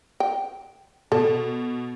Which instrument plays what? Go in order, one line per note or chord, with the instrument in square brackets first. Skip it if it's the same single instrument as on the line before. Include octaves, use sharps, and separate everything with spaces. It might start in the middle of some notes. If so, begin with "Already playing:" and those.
[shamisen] G5
[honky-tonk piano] B2 [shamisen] A4